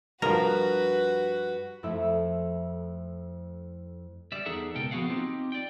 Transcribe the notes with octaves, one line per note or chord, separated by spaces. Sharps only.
G2 F3 F#4 A#4 B4
F2 A3 E4 E5
G3 D5 E5
E2 D#4 G#4 A4 E5 F#5
C#2 B2 A4 A#4 G5
F3 B3 F#4 G#4 F5 F#5
C4 D#4 F4 G4
D5 G5